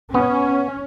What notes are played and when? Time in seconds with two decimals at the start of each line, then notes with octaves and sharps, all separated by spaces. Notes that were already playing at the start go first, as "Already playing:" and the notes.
0.14 B3 C#4